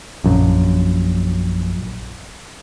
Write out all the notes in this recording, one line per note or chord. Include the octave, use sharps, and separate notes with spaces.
A#1 F#2